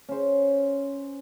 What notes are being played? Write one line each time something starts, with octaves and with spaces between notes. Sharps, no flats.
C#4 C5